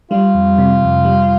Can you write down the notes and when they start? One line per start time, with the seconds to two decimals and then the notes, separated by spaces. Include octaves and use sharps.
0.11 G3 F4
0.34 F2
0.58 C3
0.82 F2
1.05 G3